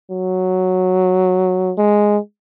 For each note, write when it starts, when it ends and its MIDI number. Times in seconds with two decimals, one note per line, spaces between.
0.11 1.73 54
1.78 2.18 56